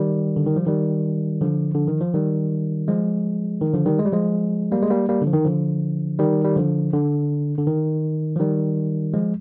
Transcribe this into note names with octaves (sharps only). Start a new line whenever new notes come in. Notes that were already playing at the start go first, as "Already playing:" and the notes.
Already playing: D#3 G3
D3
D#3
F3
D#3 G3
D3 F3
D3
D#3
F3
D#3 G3
F3 G#3
D#3
D3 F3
D#3 G3
G#3
G3
F3 G#3
G3 A#3
G#3
G3 A#3
G3 A#3
D3
F3
D#3
D3 F3
D#3 G3
G3
D3 F3
D3
D3
D#3
F3
D#3 G3
F3 G#3